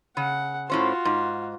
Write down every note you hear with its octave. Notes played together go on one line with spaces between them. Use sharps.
C#3 F#5
A2 C#4 F4 F#4 C5
G#2